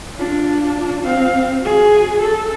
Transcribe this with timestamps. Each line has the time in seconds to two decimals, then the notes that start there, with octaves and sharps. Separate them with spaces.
0.18 D4 F4
1.03 C4 F5
1.61 F#4 G#4
2.21 A4